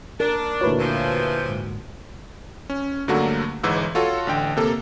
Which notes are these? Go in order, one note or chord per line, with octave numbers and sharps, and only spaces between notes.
D4 A#4
D2 A#2 E4 F#4 B4 C#5
C3 E3 F3
G#2
C#4
G2 D3 F#3 A3 A#3 F#4
G1 G#2 E3 E6
F4 F#4 A4 C#5
A1 D3 G5
C3 A#3 A4